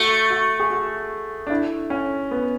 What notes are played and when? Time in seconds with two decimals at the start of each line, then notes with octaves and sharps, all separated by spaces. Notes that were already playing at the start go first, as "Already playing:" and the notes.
Already playing: A3 F#4
0.30 F#4
0.60 G#4
0.70 F#4
1.47 D4
1.50 E4
1.90 C#4
2.31 B3